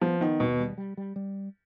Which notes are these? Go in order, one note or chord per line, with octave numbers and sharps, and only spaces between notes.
F3 B3
D#3 B3
D#2 B2
G3
G3
G3
G3